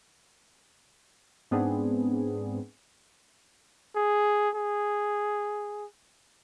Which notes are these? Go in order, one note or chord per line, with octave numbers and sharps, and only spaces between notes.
G#2 B3 C4 D4 G#4
G#4
G#4